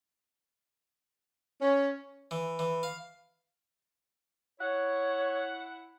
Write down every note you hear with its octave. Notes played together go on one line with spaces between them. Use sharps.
C#4
E3
E3
F5
E4 C#5 F#5